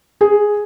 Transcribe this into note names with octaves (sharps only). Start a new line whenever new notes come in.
G#4